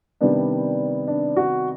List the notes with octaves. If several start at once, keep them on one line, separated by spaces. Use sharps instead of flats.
C3 D#3 G3 B3 D4
D4
F#4